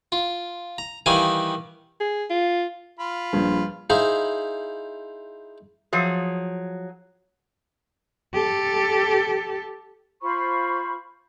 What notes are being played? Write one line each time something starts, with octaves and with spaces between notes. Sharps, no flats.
F4
A#5
D#3 E3 G3 F5 G#5 D#6
G#4
F4
F4 B5
A#1 G2
D#4 E4 G#4 C5 F5 B5
F3 F#3 G#4
G4 A4
F4 C5 B5 C#6